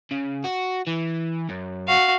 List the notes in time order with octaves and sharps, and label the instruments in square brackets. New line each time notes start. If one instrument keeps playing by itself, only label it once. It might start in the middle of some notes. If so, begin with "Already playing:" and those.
[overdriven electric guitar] C#3
F#4
E3
F#2
[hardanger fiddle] F#4 F5